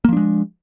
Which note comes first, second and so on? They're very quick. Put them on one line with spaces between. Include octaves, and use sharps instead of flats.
A#3 F3 D4 G#3